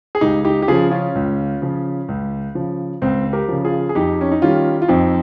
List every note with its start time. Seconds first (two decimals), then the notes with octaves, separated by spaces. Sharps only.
0.15 G#4
0.21 C#2 D#4 G4
0.45 D#4 G4
0.62 G4
0.68 C#3 F3 F4 G#4
0.91 C#4 F4
1.15 C#2
1.62 C#3 F3
2.08 C#2
2.55 C#3 F3
3.02 C#2 C4
3.33 G4 A#4
3.48 C#3 F3
3.65 F4 G#4
3.89 G#4
3.95 F2 D#4 G4
4.21 C#4
4.32 D#4
4.42 D#3 G3 C#4 F4
4.82 F4
4.88 F2 C4 D#4